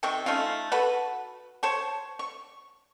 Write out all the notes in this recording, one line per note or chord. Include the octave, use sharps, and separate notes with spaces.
C3 D#3 C4 C#6
A3 C#4 D#4 F4
F#4 A4 B4 F#5
C5 C#5 A5 C#6
C#6